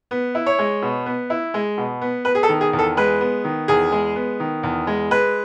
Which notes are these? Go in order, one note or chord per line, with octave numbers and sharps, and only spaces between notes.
B3
E4
C#5
G#3
B2
B3
E4
G#3
B2
B3
B3 B4
G#4
A4
D#3
G#4
E2
A4
G#3 B4
B3
D#3
E2 G#4
G#3
B3
D#3
E2
G#3
G#3 B4